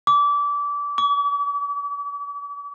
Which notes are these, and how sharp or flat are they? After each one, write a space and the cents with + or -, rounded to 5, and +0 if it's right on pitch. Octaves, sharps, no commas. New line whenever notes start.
D6 -25
D6 -45